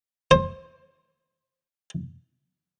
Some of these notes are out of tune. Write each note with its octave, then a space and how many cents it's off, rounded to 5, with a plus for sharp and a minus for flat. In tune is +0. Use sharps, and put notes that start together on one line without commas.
C5 +20